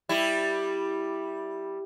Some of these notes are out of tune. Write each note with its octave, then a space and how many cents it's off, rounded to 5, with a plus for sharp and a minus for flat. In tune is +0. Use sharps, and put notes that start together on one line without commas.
G3 +0 E4 +0